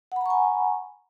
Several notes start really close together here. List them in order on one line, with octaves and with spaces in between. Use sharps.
F#5 B5 A#5 C#6 G#5